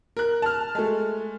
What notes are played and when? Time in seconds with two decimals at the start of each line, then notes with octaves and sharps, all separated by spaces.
0.17 A#4 F#6
0.42 A5 F6
0.75 G#3 A3